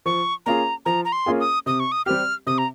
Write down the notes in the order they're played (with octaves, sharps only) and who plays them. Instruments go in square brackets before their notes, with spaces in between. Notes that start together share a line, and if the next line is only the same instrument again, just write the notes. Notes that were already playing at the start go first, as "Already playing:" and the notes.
[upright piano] F3 [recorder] C#6
[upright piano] A#3 C#4 F4 G#4 [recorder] A#5
[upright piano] F3 [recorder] A#5
[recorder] A#5
C6
[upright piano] A#3 C#4 F4 G#4
[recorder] D#6
[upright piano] C3 [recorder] D#6
[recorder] C#6
D#6
[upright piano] G3 C4 G4 [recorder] F6
[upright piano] C3 [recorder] D#6
[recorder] A#5